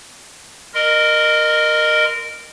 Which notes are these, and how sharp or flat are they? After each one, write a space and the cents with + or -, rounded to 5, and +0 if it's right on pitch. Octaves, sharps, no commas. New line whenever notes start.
A#4 +0 D#5 -25 C6 -20